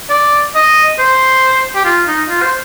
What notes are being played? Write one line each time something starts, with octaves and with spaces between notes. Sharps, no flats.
D5
D#5
C5
G4
F4
D#4
F4
C5